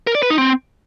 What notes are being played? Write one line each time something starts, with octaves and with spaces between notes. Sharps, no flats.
A#4
D5
B4
D#4
C4